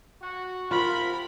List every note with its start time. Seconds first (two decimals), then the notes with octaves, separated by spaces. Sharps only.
0.22 F#4
0.71 C3 F3 F4 A#4 B5